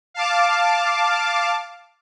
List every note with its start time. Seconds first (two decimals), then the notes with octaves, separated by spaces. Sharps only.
0.14 F5 A5 D6